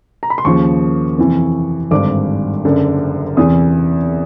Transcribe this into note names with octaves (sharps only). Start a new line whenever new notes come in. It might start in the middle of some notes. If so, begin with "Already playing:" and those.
A#5
B5
C6
D#2 C#3 F3 C#6
F2 C3 E3
G#1 G2 D3 D6
F#1 F#2 D3
E2 C3 E3 D#6